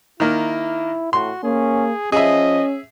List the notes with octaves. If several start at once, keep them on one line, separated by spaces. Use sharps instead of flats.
D#3 A#3 E4
A2 F#4 C6
A#3 C#4 G#4
F3 C#4 G#4 D#5 E5